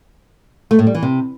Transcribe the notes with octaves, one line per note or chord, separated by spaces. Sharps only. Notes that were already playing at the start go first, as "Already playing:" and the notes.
A3
A2
G3
E3
C3